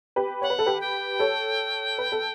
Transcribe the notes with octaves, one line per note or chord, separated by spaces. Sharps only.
G4 B4
C#5 F#5
B4
A4
G4 B4
G5
A4 C#5
B4
A4